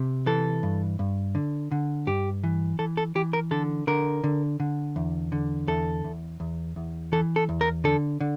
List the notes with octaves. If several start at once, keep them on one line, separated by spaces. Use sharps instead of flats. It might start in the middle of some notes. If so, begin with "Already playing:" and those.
Already playing: C3
E3 A4
G2
G2
D3
D3
G2 G4
E3
E3 A4
A4
E3 G4
A#4
D3 A4
D3 A#4
D3
D3
E2
D3
E2 A4
E2
E2
E2
E3 A4
A4
E2
A#4
D3 A4
D3